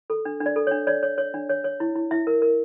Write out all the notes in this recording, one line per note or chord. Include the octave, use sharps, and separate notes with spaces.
A4
D4
D4
D5
A4
D4 C#5
C#5 D5
C#5
C#5
D4
C#5
C#5
E4
E4
E4 E5
A#4
A#4